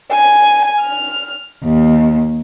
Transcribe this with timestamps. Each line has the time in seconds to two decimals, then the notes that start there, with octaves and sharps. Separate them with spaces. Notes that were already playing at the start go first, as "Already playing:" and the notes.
0.11 G#5
0.79 F6
1.64 D#2